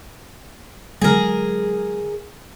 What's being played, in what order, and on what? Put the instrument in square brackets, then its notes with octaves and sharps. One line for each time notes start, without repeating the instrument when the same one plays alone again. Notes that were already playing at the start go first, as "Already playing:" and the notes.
[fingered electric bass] D3 F#3 G#3 [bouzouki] G#4 A#4